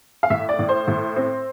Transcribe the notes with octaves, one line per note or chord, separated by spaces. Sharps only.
F5
A2 E5
D5
A2
C5
A2
C4